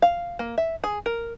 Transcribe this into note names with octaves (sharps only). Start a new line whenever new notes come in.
F5
A#3
E5
G#4
A#4